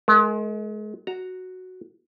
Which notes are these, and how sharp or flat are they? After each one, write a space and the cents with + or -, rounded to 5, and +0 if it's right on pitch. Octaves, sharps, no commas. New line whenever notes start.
G#3 +35 A#4 +0
F#4 +0 A#5 +0